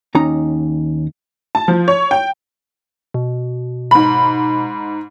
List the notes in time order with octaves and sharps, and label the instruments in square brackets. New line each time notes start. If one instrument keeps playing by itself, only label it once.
[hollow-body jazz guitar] D#2 C#4 D#4 A#5
[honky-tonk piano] A5
F3
C#5
G5
[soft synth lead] B2
[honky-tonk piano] G#2 B5